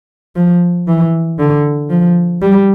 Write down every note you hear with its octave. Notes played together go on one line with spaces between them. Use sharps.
F3
E3
D3
F3
G3